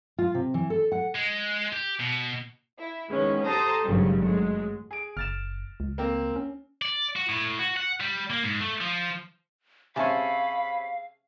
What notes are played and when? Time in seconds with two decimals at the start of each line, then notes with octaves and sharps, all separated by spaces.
0.18 F4
0.34 C3
0.54 E3
0.70 A4
0.92 F#5
1.15 G#3
1.73 G4
2.00 B2
2.78 E4
3.10 D#3 G#3 B3 C#4
3.45 G4 A4 C5 A5 A#5 D#6
3.84 G#1 G2 C#3 F#3 G3
4.21 F#3 G#3 A3
4.91 G#4 D7
5.17 F#1 F6 A6 E7
5.80 C#2
5.98 A#3 C4
6.36 C#4
6.82 D5
7.16 F#4
7.29 A2
7.59 F#4
7.77 F#5
8.00 G3
8.30 A#3
8.44 G#2
8.61 A3
8.81 F3
9.96 C3 C4 C#4 G#4 E5 F5 A5 B5